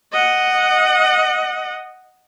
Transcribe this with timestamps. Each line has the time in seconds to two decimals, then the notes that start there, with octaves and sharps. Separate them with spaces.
0.13 D#5 F#5